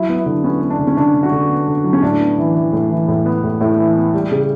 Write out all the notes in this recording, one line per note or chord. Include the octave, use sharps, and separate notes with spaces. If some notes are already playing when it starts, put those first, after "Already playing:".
Already playing: F#3 E4
B3
E4
D3
B3 C#4
B3
D4
D3
C#4
D3 D4
D3
F#4
D3
B3
D3
F#3
C#4
A2 D4
B3
E3
E3
A2
E3
A2
B3
A2
A2 E4
E3
B3
G3
C#3